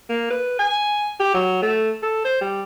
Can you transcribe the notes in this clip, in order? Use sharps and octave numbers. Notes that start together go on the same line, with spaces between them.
A#3
B4
G#5
G4
F#3
A3
A4
C5
G3